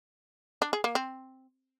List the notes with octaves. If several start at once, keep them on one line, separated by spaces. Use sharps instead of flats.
D4
G#4
A#3
C4